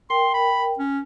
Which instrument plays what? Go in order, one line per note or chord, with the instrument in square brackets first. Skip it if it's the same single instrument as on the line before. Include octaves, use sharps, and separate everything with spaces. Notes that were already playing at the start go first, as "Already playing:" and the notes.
[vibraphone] A#4 G5 [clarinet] C6
[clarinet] B5
C#4